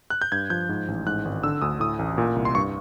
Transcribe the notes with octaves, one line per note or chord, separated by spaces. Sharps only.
F#6
G6
G2 G#6
F3 G6
G#2
A1
G#2 F#6
G#1
D3 E6
D2 D#6
A2 D#6
A1
A#2
C2
C6
G2 C#6